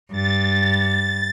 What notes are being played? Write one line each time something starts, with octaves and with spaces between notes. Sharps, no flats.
G2 A6